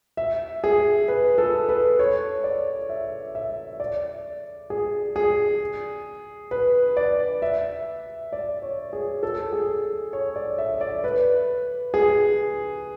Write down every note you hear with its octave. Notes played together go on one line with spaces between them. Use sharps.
E5
G#4
B4
A4
B4
C#5
D5
E5
E5
D5
G#4
G#4
B4
D5
E5
D5
C#5
G#4
A4
G#4
C#5
D5
E5
D5
B4
G#4